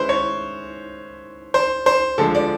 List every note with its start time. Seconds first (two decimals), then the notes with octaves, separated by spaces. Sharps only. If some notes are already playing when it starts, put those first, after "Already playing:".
Already playing: D#3 G#3 C#4 E4 B4 C5
0.09 C#5
1.54 C5
1.86 C5
2.18 D3 F3 G#3 A4
2.35 D5